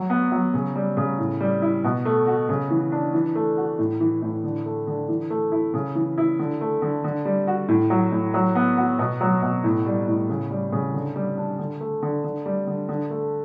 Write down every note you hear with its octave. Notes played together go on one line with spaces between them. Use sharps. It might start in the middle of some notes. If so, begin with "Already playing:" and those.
Already playing: F#3
B3
F#3
C#3
G3
C#3
A2
G3
E4
B2
A3
F#4
C#3
E3
D4
E3
A3
F#4
A2
E3
A2
D3
A3
D3
E3
A3
E4
C#3
E3
E4
D3
A3
D3
D3
G3
F#4
A2
F#3
A2
F#3
B3
F#4
B2
F#3
B2
A2
G3
A2
C#3
G3
C#3
D3
G3
D4
D3
A3
D3
D3
G3
D3
D3
A3